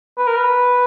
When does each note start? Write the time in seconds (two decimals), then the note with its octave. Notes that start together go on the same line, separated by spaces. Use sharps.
0.18 B4
0.27 A#4
0.36 B4